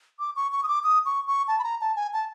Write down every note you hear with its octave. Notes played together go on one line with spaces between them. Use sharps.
D6
C#6
C#6
D#6
D6
D#6
C#6
C#6
A5
B5
A#5
A5
G#5
A5